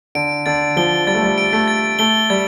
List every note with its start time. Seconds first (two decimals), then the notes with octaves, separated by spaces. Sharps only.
0.15 D3 D7
0.46 D3 A6
0.77 F3 G7
1.07 G3 A6
1.15 A3
1.23 G3
1.38 D7
1.53 A3
1.68 A6
1.99 A3 G7
2.30 G3 A6